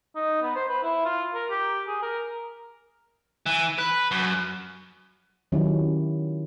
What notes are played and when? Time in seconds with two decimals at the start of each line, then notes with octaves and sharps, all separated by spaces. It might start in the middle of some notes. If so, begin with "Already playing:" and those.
0.15 D#4
0.42 B3
0.55 C5
0.69 B4
0.83 E4
1.05 F4
1.34 A#4
1.50 G4
1.87 G#4
2.02 A#4
3.46 E3
3.78 B4
4.11 F#2
5.52 D#3 F#3 C#4 E4 G4